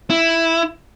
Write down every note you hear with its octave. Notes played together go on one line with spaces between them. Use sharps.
E4